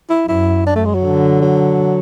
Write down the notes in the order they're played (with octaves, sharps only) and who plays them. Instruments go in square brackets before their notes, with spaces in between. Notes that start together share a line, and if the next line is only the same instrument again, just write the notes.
[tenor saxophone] E4
[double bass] F#2 [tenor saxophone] E4
[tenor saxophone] D4
A3
G#3
F#3
[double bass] D3
[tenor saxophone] F#3